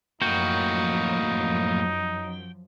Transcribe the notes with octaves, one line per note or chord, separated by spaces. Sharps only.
F#2 A2 F3 F#3 A#3 D#4 F#4 G5